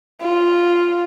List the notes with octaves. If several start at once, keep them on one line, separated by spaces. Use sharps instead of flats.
F4